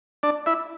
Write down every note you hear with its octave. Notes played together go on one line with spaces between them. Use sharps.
D4 D5
E4 E5